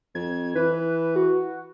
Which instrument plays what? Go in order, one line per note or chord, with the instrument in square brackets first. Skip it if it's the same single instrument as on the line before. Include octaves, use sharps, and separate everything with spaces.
[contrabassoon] F2 [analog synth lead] G#6
[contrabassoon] E3 [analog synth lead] B4
[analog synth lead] F#4